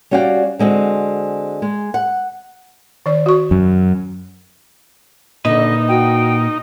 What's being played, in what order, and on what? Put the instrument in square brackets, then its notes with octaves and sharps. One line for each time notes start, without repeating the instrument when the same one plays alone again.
[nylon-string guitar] G3 C#4 F#4 D5 F5 G5
D3 G#3 C4 F#4
G#3
F#5
[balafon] D#3 D5
F#4 C#6
[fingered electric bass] F#2
[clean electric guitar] A#2 E4 B4 [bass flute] D3 [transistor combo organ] D#4 [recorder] D#5
[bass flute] F#4 [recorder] G5